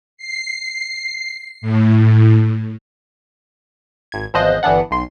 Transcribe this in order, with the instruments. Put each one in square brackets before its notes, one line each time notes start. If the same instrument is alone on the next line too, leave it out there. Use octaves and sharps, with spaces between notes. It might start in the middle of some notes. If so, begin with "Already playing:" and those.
[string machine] C7
A2
[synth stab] G#1 G#6
G#1 E2 F3 C5 D#5 F#6
G1 E3 B3 D4 F#5
B1 C6